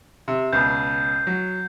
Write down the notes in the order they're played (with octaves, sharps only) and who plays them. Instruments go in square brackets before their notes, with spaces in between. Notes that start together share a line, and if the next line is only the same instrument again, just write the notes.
[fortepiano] C3
[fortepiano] C#2 B2 [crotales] G6 C7
[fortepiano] F#3